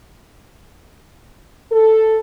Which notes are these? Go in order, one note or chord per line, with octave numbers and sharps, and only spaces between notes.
A4